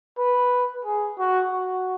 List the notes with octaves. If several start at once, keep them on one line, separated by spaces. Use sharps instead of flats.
B4
G#4
F#4
F#4